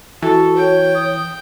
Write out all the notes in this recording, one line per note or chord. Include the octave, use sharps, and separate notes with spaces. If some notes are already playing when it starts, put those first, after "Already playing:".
E3 F#4 A4
C#5 G5
D#6